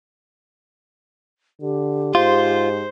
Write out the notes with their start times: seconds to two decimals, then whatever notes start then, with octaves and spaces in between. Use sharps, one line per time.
1.62 D3 G4
2.15 G#2 F4 C5